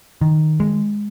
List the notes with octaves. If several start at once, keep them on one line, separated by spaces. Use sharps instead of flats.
D#3
G#3